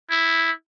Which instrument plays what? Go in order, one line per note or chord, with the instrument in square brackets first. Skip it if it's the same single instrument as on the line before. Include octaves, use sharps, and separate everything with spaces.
[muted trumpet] E4